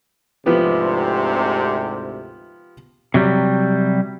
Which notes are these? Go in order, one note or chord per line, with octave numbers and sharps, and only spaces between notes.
D2 G#2 C3 F3 B3 G4
C3 F#3 G3